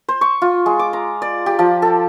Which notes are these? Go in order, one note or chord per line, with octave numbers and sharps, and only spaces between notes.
C5
C#6
F4
G#3
D6
A#5
D5
G4
F3
A4